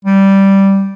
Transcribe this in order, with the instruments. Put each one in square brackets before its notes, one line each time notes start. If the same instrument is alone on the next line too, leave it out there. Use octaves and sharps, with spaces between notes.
[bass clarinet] G3